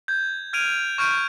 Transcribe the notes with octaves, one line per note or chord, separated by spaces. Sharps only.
G6 G#6
F6 G#6 D7 D#7 F7
C#6 F6 G6 D7 D#7